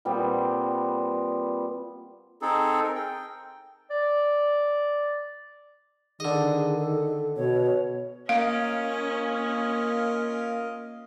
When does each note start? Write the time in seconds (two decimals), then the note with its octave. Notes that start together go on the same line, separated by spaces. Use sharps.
0.05 A#2 G3 B3 C4
2.42 C4 D#4 G#4 A4
2.83 A#4
2.95 G5
3.90 D5
6.20 D3 D#3 G#4 D#5
6.78 A4
7.36 B2 C#5
8.29 A#3 C#4 F4 A#4 D#5 F5